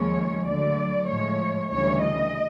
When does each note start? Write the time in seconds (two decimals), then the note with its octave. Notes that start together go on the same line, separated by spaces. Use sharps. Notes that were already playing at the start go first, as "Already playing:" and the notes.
Already playing: D#2 C#3 F3 G#3 C#5
0.46 D2 D3 F#3 D5
1.07 A2 F3 G#3 C#5
1.71 D2 C#3 E3 G3 C#5
2.01 D#5